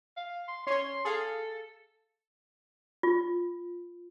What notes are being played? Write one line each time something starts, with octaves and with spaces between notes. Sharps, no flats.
F5
C6
C#4 C#5 C6
G#4 A4 F5
F4